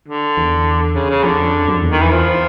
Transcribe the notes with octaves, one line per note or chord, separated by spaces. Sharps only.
D3
E2
C#3
C#3
F2 D3
F#2
F2
E2
D#3
E3
F3